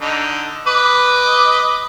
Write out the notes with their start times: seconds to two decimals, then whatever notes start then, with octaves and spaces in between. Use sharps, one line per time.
0.01 D3 D#4
0.67 B4 D#5 D6